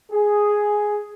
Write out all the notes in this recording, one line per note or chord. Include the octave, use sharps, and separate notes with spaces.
G#4